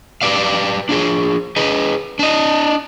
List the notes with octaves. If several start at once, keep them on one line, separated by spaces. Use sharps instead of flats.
G4 B4 D5 F5
D4 F4 G#4
G#4 B4 D#5
D4 D#5